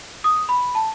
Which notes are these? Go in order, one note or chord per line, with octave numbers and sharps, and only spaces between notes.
D#6
B5
A5